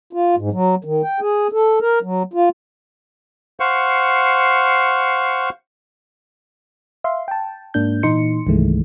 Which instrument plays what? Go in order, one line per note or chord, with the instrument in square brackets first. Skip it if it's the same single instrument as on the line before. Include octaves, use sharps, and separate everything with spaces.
[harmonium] F4
G#2
F#3
D#3
G5
G#4
A4
A#4
F#3
F4
[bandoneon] C5 F5 F#5 C#6
[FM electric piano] E5 F5 C6
G5 A5
G#2 A#3 D4 G6
A#2 E3 D#4 C6 C#7
C2 G2 D#3 E3 G#3 A3